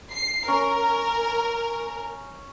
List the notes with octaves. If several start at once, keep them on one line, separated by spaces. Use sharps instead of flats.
C7
C#4 A#4